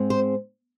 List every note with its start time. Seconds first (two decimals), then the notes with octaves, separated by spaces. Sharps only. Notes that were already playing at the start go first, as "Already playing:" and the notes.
Already playing: G#2 G#3 C4
0.10 C5